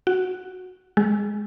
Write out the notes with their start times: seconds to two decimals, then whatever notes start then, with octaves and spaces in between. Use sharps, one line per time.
0.07 F#4
0.97 G#3